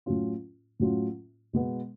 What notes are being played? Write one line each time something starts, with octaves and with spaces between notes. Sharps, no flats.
A2 F#3 C#4 F4
A2 F#3 C#4 F4
B2 G#3 B3